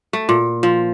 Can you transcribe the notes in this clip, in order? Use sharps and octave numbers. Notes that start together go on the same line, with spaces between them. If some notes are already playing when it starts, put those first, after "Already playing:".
A3
A#2
F3